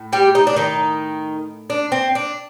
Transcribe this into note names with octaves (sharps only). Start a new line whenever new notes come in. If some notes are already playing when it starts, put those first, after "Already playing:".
Already playing: A2
G3 G4
D#4
D4
D#3 D#4
D4
C4
D4